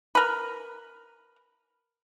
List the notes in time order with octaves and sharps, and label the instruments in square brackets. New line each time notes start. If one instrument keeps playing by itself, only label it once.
[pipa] A#4 B4